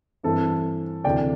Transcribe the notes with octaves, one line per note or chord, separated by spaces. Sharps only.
G2 E3 C4 A4
D2 C3 E3 D5 G5